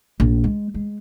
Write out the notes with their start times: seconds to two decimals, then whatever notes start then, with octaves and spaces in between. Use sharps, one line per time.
0.20 A#1
0.44 G#3
0.74 G#3